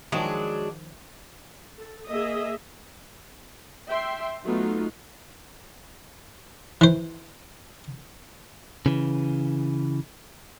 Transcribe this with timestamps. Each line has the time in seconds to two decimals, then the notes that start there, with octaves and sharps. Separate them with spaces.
0.12 D#3 F3 F#3 G#3 D4
1.78 A4
2.08 A#3 G#4 D#5 E5
3.88 E5 G5 C6
4.46 F#3 A3 B3 D#4 F4
6.81 E3 C5
8.86 C#3 E3